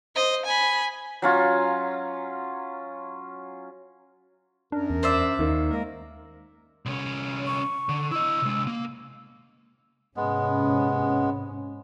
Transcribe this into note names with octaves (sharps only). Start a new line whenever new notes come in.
C5 D#5
G#5 B5
F#3 C#4 F4
F#2 D4 A#4
E2
C5 D5 E5
D#2 D#3 A#3
G#3 A#3 A#4
C2 C#4
C#6
D3
E4 D#5 E6
C3 G#3
A#3
G#2 C3 G#3 B3 C#4